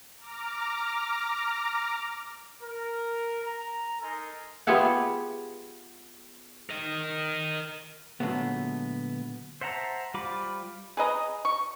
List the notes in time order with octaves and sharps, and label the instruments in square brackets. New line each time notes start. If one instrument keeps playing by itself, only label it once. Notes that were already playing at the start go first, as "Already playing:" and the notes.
[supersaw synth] A#5 D6 F6 A#6
[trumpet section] A#4
A#5
D#4 A4 A#4 G#5 A#5 C6
[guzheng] B3 F4 G4 G#4 E5 F#5
[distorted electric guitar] A#4 D#5
[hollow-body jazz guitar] A#2 D3 F#3 G#3 A3 B3
[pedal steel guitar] C5 E5 F#5 A5 A#5
G3 F4 C5 B5 D6
[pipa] G#4 B4 D#5 A#5
C#6